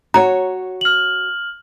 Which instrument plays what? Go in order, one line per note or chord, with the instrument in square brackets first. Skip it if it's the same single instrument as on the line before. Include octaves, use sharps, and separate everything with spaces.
[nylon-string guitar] F#4 C#5 [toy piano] A#5
[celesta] F6 F#7